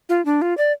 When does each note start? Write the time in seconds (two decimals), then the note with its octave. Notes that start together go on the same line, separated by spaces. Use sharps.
0.09 F4
0.25 D4
0.42 F4
0.58 D5